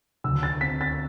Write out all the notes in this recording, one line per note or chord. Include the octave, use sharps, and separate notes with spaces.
D2 E6
A6
C4 B6
A6